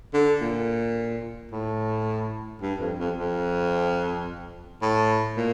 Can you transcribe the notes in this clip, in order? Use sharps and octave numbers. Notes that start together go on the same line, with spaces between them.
D3
A#2
A2
G2
F2
F2
F2
A2
A#2